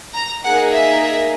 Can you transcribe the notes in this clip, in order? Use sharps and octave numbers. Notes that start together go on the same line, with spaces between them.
A#5
A#3 D#4 G#4 F#5
E5